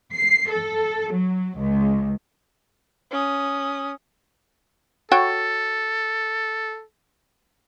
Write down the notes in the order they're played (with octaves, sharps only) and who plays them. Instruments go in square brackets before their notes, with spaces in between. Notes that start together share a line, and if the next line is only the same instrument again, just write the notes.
[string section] C7
A4
F#3
C#2
[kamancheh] C#4 D#6
[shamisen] F#4 C#5 G5 [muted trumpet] A4